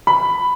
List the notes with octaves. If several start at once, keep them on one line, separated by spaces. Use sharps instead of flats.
B5